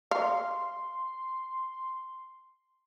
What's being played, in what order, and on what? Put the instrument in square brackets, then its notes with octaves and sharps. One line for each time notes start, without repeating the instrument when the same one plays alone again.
[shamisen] F5 [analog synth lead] C6